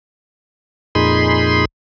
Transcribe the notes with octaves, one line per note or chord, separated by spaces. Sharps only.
F2 A#2 D#4 G#4 B5 C6